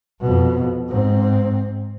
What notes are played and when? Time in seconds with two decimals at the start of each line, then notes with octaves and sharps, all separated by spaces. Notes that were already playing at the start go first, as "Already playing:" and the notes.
0.21 F2 B2
0.89 G#2 C4